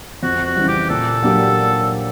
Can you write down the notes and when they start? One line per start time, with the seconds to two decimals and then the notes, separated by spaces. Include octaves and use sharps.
0.23 F2 F#4
0.45 F#4
0.56 C#3 E3 G3
0.68 G4
0.90 A#2 A4
1.22 F#3 A#3 D4 G4